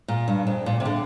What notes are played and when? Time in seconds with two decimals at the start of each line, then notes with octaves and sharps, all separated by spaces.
0.08 A#2
0.28 G2
0.47 F2
0.66 A#2
0.80 C3
0.85 D3